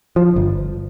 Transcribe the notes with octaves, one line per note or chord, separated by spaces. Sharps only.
F3
G1